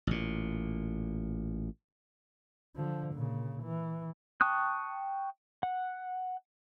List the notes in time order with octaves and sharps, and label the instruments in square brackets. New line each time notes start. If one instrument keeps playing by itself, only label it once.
[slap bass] A1 A#2
[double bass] D3 F3
A#2 C#3
E3
[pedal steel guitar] G5 A5 C#6 D#6 F#6
F#5